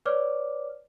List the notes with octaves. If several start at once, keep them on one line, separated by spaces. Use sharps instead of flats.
B4 C#5 D5 D6 F6